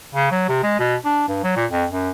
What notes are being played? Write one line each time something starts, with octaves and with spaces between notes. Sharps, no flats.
C#3
F#3
C3
G#3
B2
D4
G2
F#3
A#2
F2
F#2